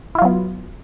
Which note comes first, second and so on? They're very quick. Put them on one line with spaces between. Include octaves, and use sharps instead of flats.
E4 F4 F#3 B3